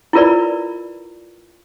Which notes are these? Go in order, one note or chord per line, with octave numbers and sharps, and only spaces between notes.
E4 F4 A#4 B4 D5